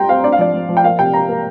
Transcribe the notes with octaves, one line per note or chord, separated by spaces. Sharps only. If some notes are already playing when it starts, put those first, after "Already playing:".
Already playing: G3 G5 A#5 C6
C4 F5
D4 D5
F5
F3 D5
F3
F3
G5
A#3 F5
C3 G5
A#3 A#5
A#3